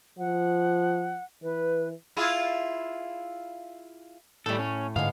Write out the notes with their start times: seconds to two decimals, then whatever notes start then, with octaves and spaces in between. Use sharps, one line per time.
0.18 F3 F#5
1.43 E3 B4
2.17 E4 F4 G#4
4.46 A2 G3 A3 A4
4.59 C#4
4.96 G#2 D3 G#3 B3 F5